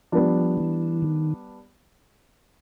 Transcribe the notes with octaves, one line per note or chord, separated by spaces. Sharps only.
F3 G3 B3 D4
E3
D#3